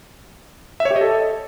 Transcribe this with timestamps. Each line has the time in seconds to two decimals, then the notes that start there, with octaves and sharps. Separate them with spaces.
0.80 E5
0.85 C#5
0.91 G4
0.96 D#5
1.01 A4